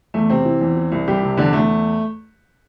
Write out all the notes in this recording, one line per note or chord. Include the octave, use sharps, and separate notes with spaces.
E2 A3
C3 C4
E3
E2
E3
C2
C2 G3 G4
C3
E2 D3 D4
E2 A3